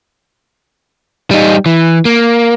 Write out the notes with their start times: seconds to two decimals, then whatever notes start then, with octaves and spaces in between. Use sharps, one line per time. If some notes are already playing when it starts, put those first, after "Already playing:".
1.31 G3 D#4
1.66 E3
2.05 A#3